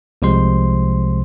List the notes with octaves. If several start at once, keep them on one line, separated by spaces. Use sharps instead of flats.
C2 C3 F3 G#3 C5 C6